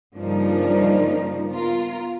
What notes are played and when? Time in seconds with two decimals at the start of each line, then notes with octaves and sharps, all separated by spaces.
0.16 G2 C#3 F3 A#3 D4 D#4
1.52 B3 F4 A#4